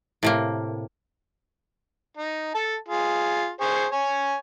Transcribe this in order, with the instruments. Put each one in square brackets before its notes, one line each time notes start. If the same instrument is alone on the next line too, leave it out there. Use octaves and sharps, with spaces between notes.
[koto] A2 C3 A#3
[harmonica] D#4
A4 A5
F4 G#4
G#4 C5 C#6
C#5 G#5